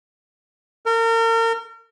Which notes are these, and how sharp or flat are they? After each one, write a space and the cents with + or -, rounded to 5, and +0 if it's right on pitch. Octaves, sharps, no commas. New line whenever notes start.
A#4 -35